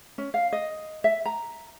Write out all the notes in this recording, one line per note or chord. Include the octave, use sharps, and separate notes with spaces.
C#4
F5
D#5
E5
A#5